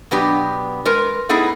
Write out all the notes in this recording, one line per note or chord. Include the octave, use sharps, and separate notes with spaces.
B2 F#3 B3 D4 G4
G#3 A#4 B4
A3 B3 D#4 E4 G#4